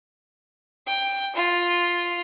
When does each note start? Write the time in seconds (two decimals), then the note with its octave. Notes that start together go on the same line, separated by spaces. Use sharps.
0.87 G5
1.36 F4